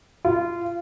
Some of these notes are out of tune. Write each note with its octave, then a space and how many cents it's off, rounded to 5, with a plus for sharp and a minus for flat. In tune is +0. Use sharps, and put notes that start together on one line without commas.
F4 -25